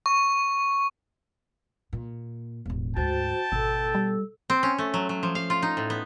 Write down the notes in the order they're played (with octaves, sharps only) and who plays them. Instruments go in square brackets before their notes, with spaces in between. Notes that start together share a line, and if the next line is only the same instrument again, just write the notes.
[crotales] C#6
[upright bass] A#2
E1 A1
[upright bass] D2 G#2 [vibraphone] F#4 C5 [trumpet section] G5 A5
[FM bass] G#1 [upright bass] B2 [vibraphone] A4 E6
[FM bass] G3
[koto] C4
C#4
A3
F#3
F#3
F3
F5
F4
D#4
A2
B3